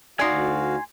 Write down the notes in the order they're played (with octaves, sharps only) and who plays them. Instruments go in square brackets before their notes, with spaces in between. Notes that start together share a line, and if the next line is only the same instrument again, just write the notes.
[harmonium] D2 F#4 F5 [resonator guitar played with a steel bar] D#4 D5 [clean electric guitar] G#5 C6